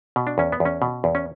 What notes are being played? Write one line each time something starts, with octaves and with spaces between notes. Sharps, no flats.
B2
D4
E2 C#4
B3
E2
C#4
B2
E2
C#4